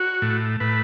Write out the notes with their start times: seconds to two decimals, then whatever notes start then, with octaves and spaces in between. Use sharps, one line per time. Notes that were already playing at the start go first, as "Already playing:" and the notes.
Already playing: F#4
0.22 A2
0.60 A2 B4